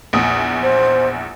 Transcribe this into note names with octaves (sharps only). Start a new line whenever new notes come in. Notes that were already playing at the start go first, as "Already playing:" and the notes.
A#1 E2 D#6
C5